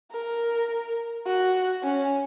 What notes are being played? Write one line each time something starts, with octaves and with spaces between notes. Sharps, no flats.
A#4
F#4
C#4